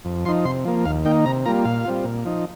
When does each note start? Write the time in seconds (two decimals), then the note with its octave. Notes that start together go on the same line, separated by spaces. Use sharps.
0.05 F2
0.25 F3 D#4 C6
0.45 C3 C6
0.65 F3 A#3
0.85 D#2 F5
1.05 D#3 A#3 D#4 G5
1.25 C3 A#5
1.45 G3 A#3 F4 A#5
1.65 A#2 F5
1.85 G3 C4 F4
2.05 A#2
2.25 F3 D#4